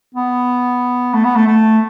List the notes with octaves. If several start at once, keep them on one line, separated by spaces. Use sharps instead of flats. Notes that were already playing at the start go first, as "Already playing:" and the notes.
B3
A3
B3
A3
A3